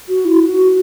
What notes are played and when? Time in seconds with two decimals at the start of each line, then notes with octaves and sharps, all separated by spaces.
0.09 F#4
0.25 E4
0.40 F#4